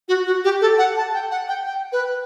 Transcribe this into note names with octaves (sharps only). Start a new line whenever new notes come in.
F#4
F#4
G4
A4
F#5
A5
G5
F#5
G5
G5
B4